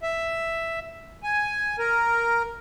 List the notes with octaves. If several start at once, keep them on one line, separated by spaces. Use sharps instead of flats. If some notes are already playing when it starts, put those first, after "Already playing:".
E5
G#5
A#4